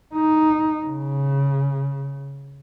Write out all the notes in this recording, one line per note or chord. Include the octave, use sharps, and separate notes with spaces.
D#4
C#3